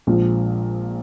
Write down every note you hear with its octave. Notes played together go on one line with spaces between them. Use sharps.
A#1 A#2 F3 G#3